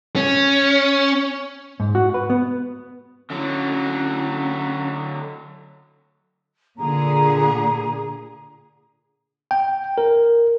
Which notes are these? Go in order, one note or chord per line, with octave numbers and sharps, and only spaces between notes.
C#4
G#2
F#4
B4
B3
D3 F#3 C#4
A#2 D3 G#4 A#5
G5
A#4